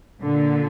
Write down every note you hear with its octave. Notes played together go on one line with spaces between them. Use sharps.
A#2 D3